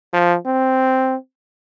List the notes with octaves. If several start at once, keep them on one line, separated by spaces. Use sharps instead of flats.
F3
C4